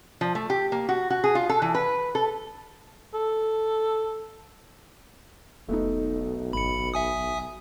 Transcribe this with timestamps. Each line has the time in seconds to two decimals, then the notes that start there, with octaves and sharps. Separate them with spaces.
0.21 F3
0.35 A3
0.50 G4
0.72 A#3
0.89 F#4
1.10 F#4
1.24 G#4
1.35 F4
1.49 A4
1.62 E3
1.75 B4
2.15 A4
3.14 A4
5.69 E1 B1 A3 B3 D#4
6.53 G#1 B5 C#7
6.94 E5 G#5 D#6